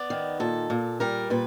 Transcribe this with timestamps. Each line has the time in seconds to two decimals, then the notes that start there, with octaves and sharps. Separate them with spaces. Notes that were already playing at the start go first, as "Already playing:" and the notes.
Already playing: B3 D5
0.10 D#3
0.40 A#2 A4
0.70 A#2
1.00 G3 A#4
1.30 A#2 B4